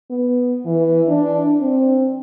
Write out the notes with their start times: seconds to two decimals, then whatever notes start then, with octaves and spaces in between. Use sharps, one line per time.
0.10 B3
0.65 E3
1.08 D4
1.61 C4